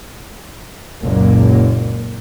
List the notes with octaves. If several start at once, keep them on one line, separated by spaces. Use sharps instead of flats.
F#1 C#2 A#2 F#3 A#3